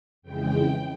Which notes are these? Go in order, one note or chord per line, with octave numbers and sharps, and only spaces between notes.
F2 C#3 E3 G#3 G5